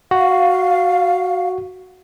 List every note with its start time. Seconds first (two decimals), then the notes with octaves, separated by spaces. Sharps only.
0.11 F#4 F5